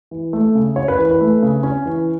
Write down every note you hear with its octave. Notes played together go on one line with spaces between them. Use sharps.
E3
A3
C#3
C#4 C#5
B4
E3
B4
A3
C#3
C#4
E3